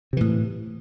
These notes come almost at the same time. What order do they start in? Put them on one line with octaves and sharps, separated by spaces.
C3 E3 A2